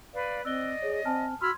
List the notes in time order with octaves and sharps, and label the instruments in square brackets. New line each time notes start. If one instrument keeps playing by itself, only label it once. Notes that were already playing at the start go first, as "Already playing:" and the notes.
[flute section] B4 D5 F5
[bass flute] C4 [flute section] D5 D#5 [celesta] E6 F#6 G7
[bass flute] G#4 [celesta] C#5
[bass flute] C4 [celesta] G#5 A5 F6
[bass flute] F#4 [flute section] B5 E6 F6 [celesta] C6 G#6